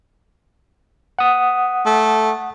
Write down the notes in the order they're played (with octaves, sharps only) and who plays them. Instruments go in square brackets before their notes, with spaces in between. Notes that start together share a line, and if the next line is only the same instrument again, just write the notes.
[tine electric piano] F#5 D#6
[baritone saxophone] A3